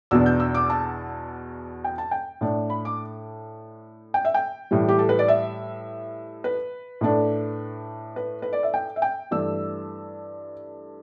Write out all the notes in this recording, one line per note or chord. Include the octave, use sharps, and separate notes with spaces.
E2 B2 B3 D4 E6
G6
E6
D6
A5
G5
A5
G5
A2 A3 D4
B5
D6
G5
E5
G5
A2 E3 G3
G4
A4
B4
D5
E5
B4
A2 A3 D4
B4
B4
D5
E5
G5
E5
G5
G2 E3 A3 E6